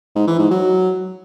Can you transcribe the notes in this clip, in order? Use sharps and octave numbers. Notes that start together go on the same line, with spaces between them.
G#2
E3
G#2
F#3